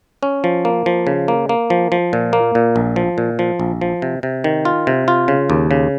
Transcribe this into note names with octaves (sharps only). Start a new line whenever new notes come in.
C#4
F3
A#3
F3
C#3
A#3
A#3
F3
F3
A#2
A#3
A#2
A#1
F3
A#2
F3
A#1
F3
C3
C3
D#3
F4
C3
F4
C#3
D#2
C#3